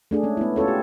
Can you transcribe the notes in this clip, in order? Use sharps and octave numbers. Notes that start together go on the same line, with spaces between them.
A3 D4 G#4
G#3 C#4
B3 E4
C#4 F4 A4 C#5
G4